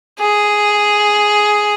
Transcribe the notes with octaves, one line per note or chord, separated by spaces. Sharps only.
G#4